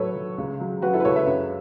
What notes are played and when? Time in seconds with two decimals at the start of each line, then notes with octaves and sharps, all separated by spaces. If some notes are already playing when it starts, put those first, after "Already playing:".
Already playing: A2 F#3 A4 B4 C#5
0.16 F#3
0.38 C#2
0.60 F#3
0.82 F#3 F#4 B4
0.93 E4 A4
1.00 B4
1.05 C#2 A4 C#5
1.16 B4 E5
1.27 F#2